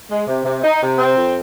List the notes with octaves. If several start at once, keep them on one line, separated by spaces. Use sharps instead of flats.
G#3
C3
C3
D#4
C3
C4
F2